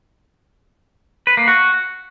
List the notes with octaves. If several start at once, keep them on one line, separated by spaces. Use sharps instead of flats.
B4
A#3
F#4